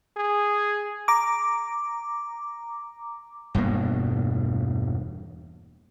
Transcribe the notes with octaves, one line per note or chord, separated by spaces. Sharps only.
G#4
A#5 D6
E1 G2 B2 A#3